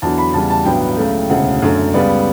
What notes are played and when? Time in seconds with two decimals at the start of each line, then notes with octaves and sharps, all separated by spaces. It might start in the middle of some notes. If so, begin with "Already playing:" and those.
0.02 E2 D3 F#3 A5
0.18 B5
0.34 E2 C#3 G3 A5
0.50 A5
0.66 A1 G2 F#3 B3 G5
0.97 C#2 C#3 F#3 A3
1.30 E1 D2 C#3 F#5
1.62 F#2 D3 F#3 A3
1.94 C#2 C#3 G3 B3 D5